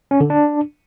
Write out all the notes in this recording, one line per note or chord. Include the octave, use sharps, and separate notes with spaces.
C#4
D3
D4